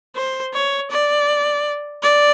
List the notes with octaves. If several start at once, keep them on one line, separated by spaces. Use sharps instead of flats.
C5
C#5
D5
D5